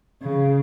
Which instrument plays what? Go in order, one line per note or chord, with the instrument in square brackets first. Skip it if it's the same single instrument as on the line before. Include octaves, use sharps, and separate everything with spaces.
[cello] C#3